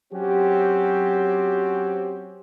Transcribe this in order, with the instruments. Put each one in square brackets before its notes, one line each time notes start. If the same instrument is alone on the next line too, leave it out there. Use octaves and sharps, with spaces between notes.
[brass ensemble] F#3 C4 C#4 F#4 G4